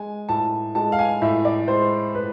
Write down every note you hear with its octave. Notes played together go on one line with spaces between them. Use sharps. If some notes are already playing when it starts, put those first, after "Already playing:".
Already playing: G#3 G#5
A2 A5
G#3 A5
F5
G#5
A2 E5
D5
G#3 C5
A2 B4